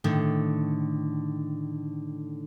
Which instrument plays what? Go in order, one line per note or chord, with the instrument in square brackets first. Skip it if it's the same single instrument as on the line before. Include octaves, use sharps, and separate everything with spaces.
[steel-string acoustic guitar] A2 D3 D#3